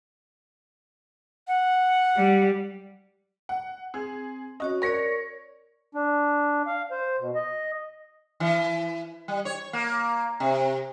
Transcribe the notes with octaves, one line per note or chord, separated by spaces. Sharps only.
F#5
G3
F#5
C4 G#4
C#4 F#4 C#5 D#5
A#4 C#5 D5 A#6 C#7
D4
F5
C5
B2
D#5
E3
G3
C#5
A#3
C3